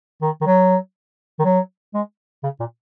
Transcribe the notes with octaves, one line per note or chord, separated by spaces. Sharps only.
D#3
D#3
F#3
D#3
F#3
G#3
C#3
A#2